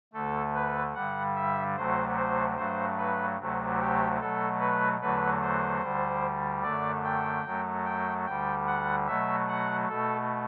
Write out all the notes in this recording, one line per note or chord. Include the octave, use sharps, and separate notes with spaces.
D2 D3 A3 A4
B4
G2 D3 G3 F#5
E5
D2 C3 F#3 A3 C5
C5
G2 F#3 A3 C5
B4
D2 C3 F#3 A3
G4
B2 F#3 A3 A4
B4
E2 D3 F#3 A3 B4
C5
D2 D3 G3
F#2 D3 A3 D5
G5
F#2 F#3 A3
G5
D2 D3 G3 G5
F#5
B2 F#3 A3 E5
F#5
B2 A3 A4